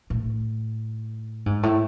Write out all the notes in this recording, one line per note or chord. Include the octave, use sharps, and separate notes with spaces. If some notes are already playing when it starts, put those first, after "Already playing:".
A2
G#2
A2